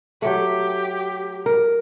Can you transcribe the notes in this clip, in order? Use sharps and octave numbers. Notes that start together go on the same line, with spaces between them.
F#3 A3 G4
A#4